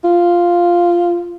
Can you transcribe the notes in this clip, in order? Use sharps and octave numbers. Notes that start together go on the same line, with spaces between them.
F4